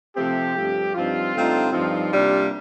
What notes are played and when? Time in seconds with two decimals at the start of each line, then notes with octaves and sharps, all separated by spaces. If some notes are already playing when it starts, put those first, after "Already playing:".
0.17 C3 F3 A3 C4 G4
0.55 G2 F3 A3
0.95 G2 F3 C4 D#4 F4
1.33 G2 D3 A3 C4 D#4
1.73 G2 F3 C4 D#4 F4
2.12 C3 G3 A#3 D4